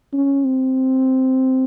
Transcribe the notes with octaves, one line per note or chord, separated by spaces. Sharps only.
C#4
C4